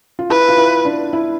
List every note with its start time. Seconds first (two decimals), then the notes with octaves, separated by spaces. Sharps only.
0.19 F4
0.30 E4 B4
0.49 F4
0.57 E4
0.85 D4
1.13 E4